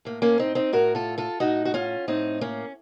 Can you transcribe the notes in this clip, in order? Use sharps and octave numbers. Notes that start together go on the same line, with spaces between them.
A2 A#3
A#3 C#4
C4 D#4
C4 D#4
A2 F#4 A#4
F4 A4
F4 A4
A2 D#4 F#4
F#4
C#4 F4
A2 C4 D#4
A#3 C#4